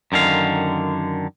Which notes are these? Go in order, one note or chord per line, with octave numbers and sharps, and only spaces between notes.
F#2 D3 D#3 F5